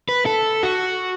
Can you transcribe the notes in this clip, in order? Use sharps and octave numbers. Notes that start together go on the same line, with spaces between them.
B4
A4
F#4